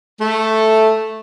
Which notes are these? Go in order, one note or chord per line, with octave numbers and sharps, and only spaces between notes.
A3